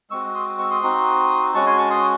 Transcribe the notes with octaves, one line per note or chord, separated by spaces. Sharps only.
G#3 C4 F#4 C#6 E6
C6 D#6
C#6 E6
C6 D#6
C4 D#4 F#4
G#3 C#4 F#4 A5 C#6
G#5 C6
A5 C#6
C6 D#6